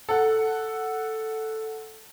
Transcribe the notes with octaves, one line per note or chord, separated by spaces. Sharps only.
A4 F#5